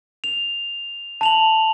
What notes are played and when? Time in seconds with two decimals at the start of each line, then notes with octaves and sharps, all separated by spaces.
0.24 F7
1.21 A5 F7 F#7